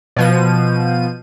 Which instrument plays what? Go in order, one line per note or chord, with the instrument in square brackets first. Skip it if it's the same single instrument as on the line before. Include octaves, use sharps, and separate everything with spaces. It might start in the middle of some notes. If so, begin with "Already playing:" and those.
[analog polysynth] B2 F3 D#7